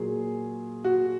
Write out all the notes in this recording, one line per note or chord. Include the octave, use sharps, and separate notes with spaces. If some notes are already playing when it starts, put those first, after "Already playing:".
Already playing: A#2 F#3 A#3 G#4
F#4